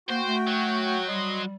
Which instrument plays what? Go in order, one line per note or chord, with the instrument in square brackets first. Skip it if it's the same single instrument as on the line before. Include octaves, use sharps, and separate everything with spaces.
[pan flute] A#3 [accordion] F#4 G5 [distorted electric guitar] C5
[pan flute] A3
[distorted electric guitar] F#3
[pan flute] G3 [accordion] D#5 C6